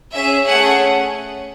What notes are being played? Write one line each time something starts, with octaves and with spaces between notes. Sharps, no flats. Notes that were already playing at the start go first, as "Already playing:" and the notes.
C#4 G#4 E5
A3 C#4 G#4 F#5